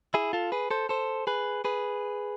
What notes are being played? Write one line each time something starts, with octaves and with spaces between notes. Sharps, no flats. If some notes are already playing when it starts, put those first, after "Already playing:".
E4 G#4
F4 A4
G#4 B4
A4 C5
A4 C5
G#4 B4
G#4 B4